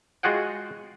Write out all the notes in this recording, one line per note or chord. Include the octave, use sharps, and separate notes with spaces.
G#3 F4 F#4 G#4 F#5 G5